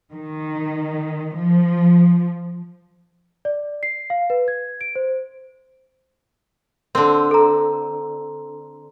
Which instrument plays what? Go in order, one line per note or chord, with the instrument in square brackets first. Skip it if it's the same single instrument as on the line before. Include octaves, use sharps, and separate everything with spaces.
[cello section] D#3
F3
[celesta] D5
C7
F5
B4
G#6
D7
C5
[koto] D3 C4
[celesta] A4 A#5